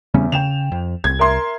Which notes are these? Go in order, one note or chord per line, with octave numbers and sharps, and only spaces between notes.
E2 C#3 G3 C#4
C#3 G5 E7 F7
F2
C2 G#6
A#4 E5 C6